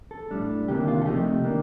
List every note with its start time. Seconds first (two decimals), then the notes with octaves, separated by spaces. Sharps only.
0.11 A4
0.31 A2 G3 D4
0.68 D2 C3 D#3 A#3 D4 G4
0.88 F4
1.01 A4
1.06 C3 F3 A3 D#4 G4
1.44 D#3 A#3 D4